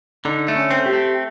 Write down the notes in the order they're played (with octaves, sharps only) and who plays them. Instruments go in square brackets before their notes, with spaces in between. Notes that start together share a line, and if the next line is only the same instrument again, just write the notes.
[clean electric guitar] D3 [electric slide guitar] D#4
[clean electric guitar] A3
[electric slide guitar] C#4
[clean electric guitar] C4
[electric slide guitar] G4
[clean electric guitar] A3